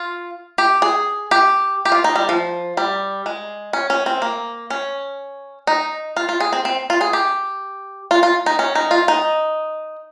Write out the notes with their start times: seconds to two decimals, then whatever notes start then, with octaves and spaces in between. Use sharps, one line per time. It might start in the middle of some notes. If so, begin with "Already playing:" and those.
Already playing: F4
0.58 G4
0.82 G#4
1.31 G4
1.85 G4
1.92 F4
2.04 D#4
2.16 G3
2.29 F3
2.77 G3
3.26 G#3
3.73 C#4
3.90 C#4
4.06 C4
4.22 A#3
4.70 C#4
5.67 D#4
6.17 F4
6.29 F4
6.40 G#4
6.53 C4
6.65 C4
6.90 F4
7.01 G#4
7.13 G4
8.11 F4
8.23 F4
8.46 D#4
8.59 C#4
8.75 D#4
8.91 F4
9.08 D#4